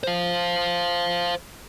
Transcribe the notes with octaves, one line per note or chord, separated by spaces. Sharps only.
C5 F5